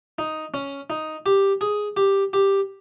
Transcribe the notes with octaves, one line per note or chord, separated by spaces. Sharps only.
D#4
C#4
D#4
G4
G#4
G4
G4